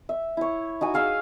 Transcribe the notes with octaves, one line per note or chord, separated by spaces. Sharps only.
E5
E4 C#5
D#4 F#4 G#5
G#4 F5 C#6 E6